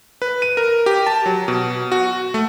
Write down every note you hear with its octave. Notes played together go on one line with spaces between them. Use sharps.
B4
D#7
A#4
G4
A5
F#3
B2
F#4
A3